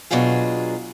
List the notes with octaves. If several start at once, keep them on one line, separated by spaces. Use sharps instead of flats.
B2 F#3 D4 F4 G#4